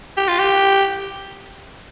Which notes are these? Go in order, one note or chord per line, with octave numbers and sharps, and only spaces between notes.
G4
F4
G4